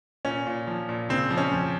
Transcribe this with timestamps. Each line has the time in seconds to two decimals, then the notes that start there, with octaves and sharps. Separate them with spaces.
0.25 A#2 C#4
0.47 A#2
0.67 F3
0.89 A#2
1.09 C#3 C4
1.30 F3
1.37 C#4
1.52 F2